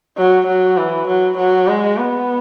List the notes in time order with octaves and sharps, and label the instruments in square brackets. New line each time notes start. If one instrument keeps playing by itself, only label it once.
[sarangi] F#3
F#3
E3
F#3
F#3
G#3
B3